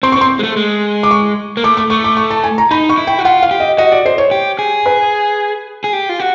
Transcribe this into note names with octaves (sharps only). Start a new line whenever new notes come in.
C4 C6
C#6
C4
C6
G#3
A3
G#3
D6
C#6
A#3
A3 D6
D6
A3 C#6
D6
C#6
A5
G#5
A#5
D#4 B5
C#6
E4
G5
F#4
F4 F#5
F5
G4
D#5
F#4 D#5
D5
C5
C#5
G4
G#4
B4
G#4
G4
F4
F#4